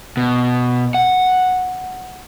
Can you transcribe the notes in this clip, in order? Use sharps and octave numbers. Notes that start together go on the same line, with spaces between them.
B2
F#5